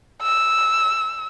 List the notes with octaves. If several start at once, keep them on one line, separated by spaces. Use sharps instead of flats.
E6